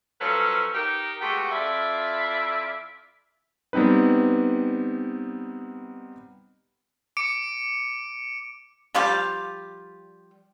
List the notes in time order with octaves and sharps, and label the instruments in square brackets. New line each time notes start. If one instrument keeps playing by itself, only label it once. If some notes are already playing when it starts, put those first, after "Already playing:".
[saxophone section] F3 F#3 C#4 F4 A4 B4
D#4 G4 A#4
G#3 A3 B3 F#4 G4
F2 E4 F4 D5 E5
[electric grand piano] G3 B3 C4 D#4 B4
[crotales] D6 C#7 D7
[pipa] F3 G3 F4 G4